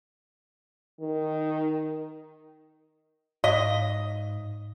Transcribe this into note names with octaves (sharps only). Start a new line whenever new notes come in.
D#3
G#2 D#5 F5